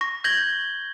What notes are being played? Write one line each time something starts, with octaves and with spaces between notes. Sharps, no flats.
C#6 A#6
G6 G#6 A#6 F#7 G7